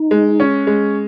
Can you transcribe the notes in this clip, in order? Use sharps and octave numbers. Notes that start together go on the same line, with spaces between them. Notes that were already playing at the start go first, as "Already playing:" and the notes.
Already playing: D#4
G#3
C#4
G#3